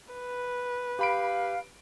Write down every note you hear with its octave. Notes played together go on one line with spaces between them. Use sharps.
B4
G4 F5 B5 D7